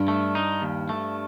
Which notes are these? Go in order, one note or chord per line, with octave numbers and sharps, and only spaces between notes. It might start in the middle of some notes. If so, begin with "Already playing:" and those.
Already playing: G2
A3
D#4
D#2
A3